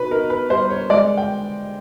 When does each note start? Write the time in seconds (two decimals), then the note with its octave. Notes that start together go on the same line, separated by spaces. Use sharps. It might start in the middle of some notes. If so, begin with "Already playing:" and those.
Already playing: B2 D#4 B4
0.11 D#4 A#4
0.30 B4
0.50 G3 C5
0.70 C#5
0.90 G#3 D5
1.17 G5